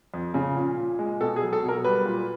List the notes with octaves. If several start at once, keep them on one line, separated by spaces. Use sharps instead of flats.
F2
C#3
A#2
A#2
G#3
B2 A4
G#4
F#3
A4
B2
A#4
G3 B4
A#2